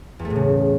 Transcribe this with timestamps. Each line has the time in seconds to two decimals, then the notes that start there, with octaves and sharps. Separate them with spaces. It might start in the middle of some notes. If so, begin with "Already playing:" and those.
0.19 E2
0.25 A3
0.30 A2
0.36 C#3